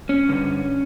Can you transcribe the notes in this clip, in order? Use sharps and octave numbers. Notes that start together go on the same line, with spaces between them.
C#4
G2 D3